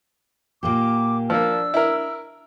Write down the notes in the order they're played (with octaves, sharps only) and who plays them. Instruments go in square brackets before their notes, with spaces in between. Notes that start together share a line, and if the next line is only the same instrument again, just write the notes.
[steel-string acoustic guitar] A#2 A#3 G4 [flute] D6
[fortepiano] F3 A#3 [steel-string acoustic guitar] D4 [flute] E6
[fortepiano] E4 A#4